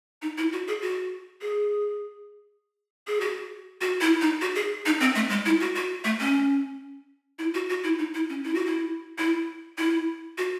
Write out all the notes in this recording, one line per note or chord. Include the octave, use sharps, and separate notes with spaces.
D#4
E4
F#4
G#4
F#4
G#4
G#4
F#4
F#4
E4
D#4
F#4
G#4
D#4
C4
A3
G#3
E4
F#4
F#4
A3
C#4
E4
F#4
F#4
E4
D#4
E4
C#4
E4
F#4
E4
E4
E4
F#4